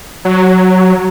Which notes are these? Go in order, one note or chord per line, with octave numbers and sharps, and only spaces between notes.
F#3